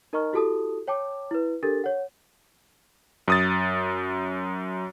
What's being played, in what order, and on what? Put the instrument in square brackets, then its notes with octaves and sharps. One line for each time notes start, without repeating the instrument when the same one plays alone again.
[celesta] D#4 A#4 D#5 A#5 C#6 F6
E4 F#4 G4 A4 A5 D#6
C#5 G5 A5 D6
E4 B4
D4 G4 A4 A#4 A6
C#5 F#5
[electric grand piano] F#2 D#6 A6